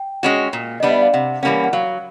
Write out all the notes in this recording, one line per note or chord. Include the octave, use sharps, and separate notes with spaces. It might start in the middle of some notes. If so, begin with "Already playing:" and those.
Already playing: G5
G#3 C#4 F#4
A#2
G3 B3 D4 D#5
E5
F5
C3 F#5
E3 G3 A#3 C#4 F#5
F#5
F#3 F5